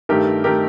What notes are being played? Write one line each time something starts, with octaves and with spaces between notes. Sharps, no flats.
G2 D#3 A3 G4 A#4
D#3 A3 G4 A#4